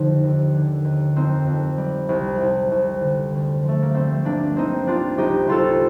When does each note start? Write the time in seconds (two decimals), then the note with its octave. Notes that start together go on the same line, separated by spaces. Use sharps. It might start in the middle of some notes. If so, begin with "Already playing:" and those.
Already playing: F2 D3 F3 D#4 G4
0.23 D#2
0.55 D3
0.85 D#2
1.16 F2 C4 D#4
1.46 F2
1.78 G3
2.09 C2
2.40 C2
2.71 C2
3.01 D3
3.33 D2
3.64 F3 A3
3.82 A#3
3.94 G3 A3 C4
4.25 G1 A#3 D4
4.55 G3 C4 D#4
4.86 C2 D4 F4
5.18 C2 D#4 G4
5.47 C2 F4 A4